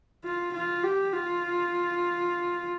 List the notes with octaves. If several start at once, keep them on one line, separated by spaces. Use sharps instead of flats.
F4
F4
G4
F4